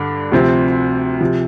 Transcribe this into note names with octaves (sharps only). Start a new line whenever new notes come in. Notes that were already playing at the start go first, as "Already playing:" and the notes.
Already playing: G2 D3 D4
D2 C3 F3 C4
C3 F3